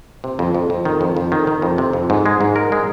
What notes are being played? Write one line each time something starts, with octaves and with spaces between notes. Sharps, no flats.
C3
F2
F2
F2
D#3
F2
F2
D#3
D#3
F2
C3
F2
G#2
G#3
G#2
A#4
G#3